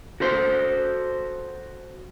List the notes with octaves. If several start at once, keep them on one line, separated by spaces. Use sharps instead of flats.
F#4 A4 C5